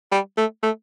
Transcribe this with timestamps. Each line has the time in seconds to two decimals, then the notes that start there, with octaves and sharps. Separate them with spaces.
0.12 G3
0.38 A3
0.63 A3